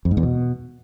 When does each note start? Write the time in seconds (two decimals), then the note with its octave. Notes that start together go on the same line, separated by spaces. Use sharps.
0.05 F2
0.11 G#2
0.17 E2
0.23 B2